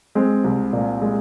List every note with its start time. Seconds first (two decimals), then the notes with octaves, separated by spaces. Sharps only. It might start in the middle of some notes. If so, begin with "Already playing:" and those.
0.15 G#3 C4
0.44 C2
0.73 A#2
1.02 G#3